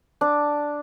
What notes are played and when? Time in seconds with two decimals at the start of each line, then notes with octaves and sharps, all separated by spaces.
0.21 D4